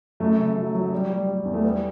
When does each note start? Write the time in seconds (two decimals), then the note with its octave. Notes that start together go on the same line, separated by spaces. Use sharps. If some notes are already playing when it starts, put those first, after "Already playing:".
0.20 F#2 A3
0.38 C#3
0.56 F#3
0.74 F#3
0.93 G3
1.10 G3
1.28 G3
1.45 E2
1.54 A3
1.63 G3 B3